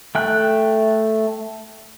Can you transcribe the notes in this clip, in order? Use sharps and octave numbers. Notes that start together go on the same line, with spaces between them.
A3 G5 F#6